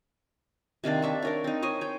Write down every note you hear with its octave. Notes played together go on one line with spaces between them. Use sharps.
C3 D#3 A#3 D4
D4 E5 C#6
D4 A#4 C#5
C4 D#4
C5 C#5 D#5 G#5
C#5 G5